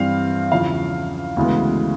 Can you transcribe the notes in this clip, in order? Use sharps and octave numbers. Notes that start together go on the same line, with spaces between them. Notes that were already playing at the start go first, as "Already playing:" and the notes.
Already playing: G2 E3 G3 C4 F5
E2 C#3 F3 F5
D2 C#3 E3 G#3 B3